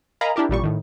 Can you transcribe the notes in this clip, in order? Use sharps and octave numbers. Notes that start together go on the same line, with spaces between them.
A#4 D#5 F5 G#5 A#5 B5
D4 E4 G4 A#4
A1 A#2 G3 C#6
A2 D#3